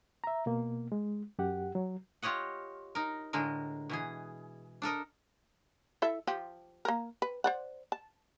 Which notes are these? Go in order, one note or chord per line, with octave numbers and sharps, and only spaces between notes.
E5 A#5
B2 A#3
G#3
F#2 G4 F#5
F#3
F4 G4 C#5 D#5 F#5
D#4 A#4
A2 D3 G#3 A#4
B2 E3 G#4
D4 A4 A#4 D#5
E4 A4 E5
F3 G4
A#3 A#4
B4
C5 D5 F#5
A5